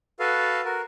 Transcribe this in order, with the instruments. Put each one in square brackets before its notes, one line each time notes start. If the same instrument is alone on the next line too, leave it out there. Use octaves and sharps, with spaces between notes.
[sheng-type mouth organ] F#4 A4 B4 F5
F#4 A#4